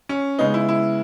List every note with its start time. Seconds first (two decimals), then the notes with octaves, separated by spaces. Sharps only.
0.09 C#4
0.38 C#3 G#3 B3 D#4
0.54 E4
0.69 E4